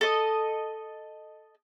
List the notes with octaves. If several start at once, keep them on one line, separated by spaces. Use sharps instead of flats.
A4 D#5